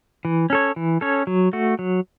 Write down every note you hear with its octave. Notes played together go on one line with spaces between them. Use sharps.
E3
C#4 A4 C#5
E3
C#4 A4 C#5
F#3
A3 F#4
F#3